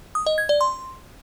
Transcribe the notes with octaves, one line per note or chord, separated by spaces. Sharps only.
D#6
D#5
G#6
D5
C6